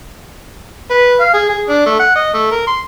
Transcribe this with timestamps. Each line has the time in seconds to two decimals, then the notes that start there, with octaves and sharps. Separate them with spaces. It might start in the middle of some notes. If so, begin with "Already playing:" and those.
0.91 B4
1.20 F5
1.34 G#4
1.49 G#4
1.68 D4
1.86 A3
2.00 F#5
2.16 D#5
2.34 A3
2.51 A#4
2.67 C6